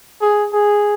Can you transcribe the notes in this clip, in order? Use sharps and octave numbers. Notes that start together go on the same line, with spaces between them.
G#4
G#4